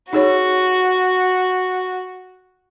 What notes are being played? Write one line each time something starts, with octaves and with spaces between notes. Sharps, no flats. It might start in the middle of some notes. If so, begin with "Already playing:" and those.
D#4 F#4 G#4 C#5